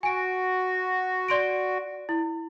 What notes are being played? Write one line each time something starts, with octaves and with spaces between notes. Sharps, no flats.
F#4 G#5 D7
D5 C6 D7
E4